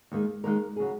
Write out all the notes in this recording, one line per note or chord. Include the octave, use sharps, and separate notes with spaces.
D#2 D#3 G#3
D#2 D#3 G#3 A#4
C#3 F#3 G#4